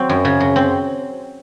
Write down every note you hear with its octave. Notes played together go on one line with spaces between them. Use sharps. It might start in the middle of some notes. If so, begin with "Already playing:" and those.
Already playing: F#3 C4
F#2
C#3
F#3
C4